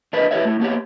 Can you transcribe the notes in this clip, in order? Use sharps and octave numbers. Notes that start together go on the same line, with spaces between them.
D4 A#4 B4 D5 D#5
E4 G4 G#4 B4 C#5 E5
A3 E4
A#3 B3 G4 C#5